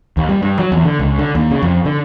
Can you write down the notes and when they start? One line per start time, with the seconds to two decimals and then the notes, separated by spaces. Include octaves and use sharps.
0.17 D#2
0.29 G3
0.42 G2
0.59 F#3
0.72 E2
0.85 D3
0.99 C#2
1.19 D3
1.35 D#2
1.51 C#3
1.62 F2
1.85 D3